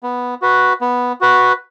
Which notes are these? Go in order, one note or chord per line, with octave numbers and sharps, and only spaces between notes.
B3
F#4 B4
B3
F#4 B4